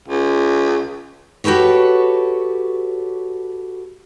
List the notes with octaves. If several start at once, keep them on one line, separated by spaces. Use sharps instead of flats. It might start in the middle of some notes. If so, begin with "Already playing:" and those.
C#2
F#4 G4 A4 B4 C#5